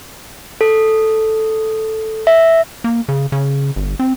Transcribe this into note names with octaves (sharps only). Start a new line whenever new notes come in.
A4
E5
A#3
C#3
C#3
G1
C4